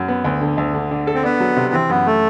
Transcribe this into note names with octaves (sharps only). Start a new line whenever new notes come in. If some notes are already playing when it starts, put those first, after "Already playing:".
Already playing: F#2 F#3
B3
D2
D3
D2
D3
D3
A4
C4
B3 D4
F#3
C3
E3 C4
F#2 B3
A3